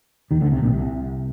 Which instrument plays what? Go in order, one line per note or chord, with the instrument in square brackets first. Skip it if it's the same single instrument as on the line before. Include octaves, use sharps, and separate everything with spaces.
[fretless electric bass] D#2 D#3
D2 D3
C2 C3
A#1 A#2
C2 C3